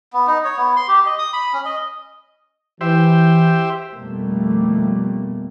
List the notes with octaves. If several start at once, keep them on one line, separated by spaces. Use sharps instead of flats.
B3
D#4
C#5
B3
C6
G4
D#5
D#6
B5
C#4
D#5
E3 G4 C5 E5
F2 B2 G3 A3 A#3